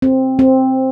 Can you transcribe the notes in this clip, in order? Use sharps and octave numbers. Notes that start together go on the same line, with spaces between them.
C4
C4